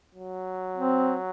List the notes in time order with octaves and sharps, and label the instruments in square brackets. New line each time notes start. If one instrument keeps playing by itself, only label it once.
[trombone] F#3
[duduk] C4